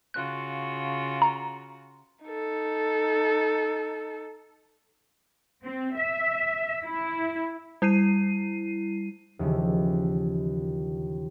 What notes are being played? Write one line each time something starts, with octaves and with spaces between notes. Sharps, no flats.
C#3 F4 F#4 F#6
A#5
D#4 A4
C4
E5
E4
G3 E4 C7 D#7
D#2 C#3 E3 F3